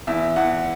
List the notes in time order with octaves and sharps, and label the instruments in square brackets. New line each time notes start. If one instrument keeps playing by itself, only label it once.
[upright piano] E2 E5
E2 F#5